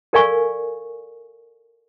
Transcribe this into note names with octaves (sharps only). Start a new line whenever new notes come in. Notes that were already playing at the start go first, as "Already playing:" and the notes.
A4 A#4 D5 F5 G#5 C#6